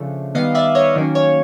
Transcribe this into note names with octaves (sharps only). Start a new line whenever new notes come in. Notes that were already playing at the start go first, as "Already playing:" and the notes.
Already playing: C#3 F3 A3 D4
D#3 G3 B3 D#5 F5
D5 E5
C#5 D#5
D#3 F#3 A#3 C#4
C#5